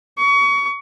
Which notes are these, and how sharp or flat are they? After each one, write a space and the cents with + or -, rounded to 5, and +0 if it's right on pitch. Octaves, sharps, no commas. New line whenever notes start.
C#6 +30